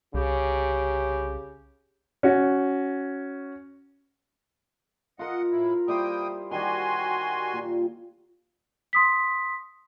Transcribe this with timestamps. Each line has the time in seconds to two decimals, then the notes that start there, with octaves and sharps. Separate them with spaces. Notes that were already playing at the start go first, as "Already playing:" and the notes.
0.14 C2 C#3 G4
2.23 C#4 F#4
5.19 F4 A#4 D#5 F#5
5.51 A2 E4
5.88 G3 A#3 E4 C5 G5 D#6
6.51 D#3 G3 F#4 G#5 C6
7.53 A#2
8.93 C6 D#6 B6